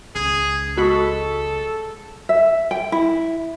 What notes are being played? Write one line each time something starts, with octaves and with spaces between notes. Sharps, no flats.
C#2 G#4
G#3 F#4 A4 B5 C#6 D#6 B6
E5
G5
E4